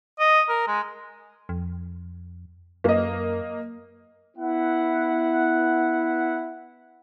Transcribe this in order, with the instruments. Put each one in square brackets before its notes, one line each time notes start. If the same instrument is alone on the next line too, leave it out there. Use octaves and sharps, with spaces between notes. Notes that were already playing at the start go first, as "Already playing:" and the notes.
[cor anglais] D#5
A#4
G#3
[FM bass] F2
[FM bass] F#2 [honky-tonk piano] A#3 D#5
[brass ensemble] B3 E4 F#5